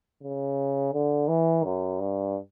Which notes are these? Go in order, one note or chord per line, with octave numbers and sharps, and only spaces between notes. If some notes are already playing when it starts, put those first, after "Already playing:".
C#3
D3
E3
F#2
G2